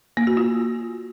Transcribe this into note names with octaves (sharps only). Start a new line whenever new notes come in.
A#3
F#4
F4